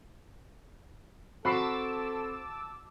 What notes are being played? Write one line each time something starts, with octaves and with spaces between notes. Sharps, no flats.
C4 F#4 A4 A5 B5 D6 E6 C7